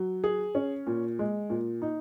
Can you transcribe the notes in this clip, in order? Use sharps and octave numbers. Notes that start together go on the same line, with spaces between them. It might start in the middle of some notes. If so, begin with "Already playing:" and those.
Already playing: F#3
G#4
C#4
A#2
G#3
A#2
D#4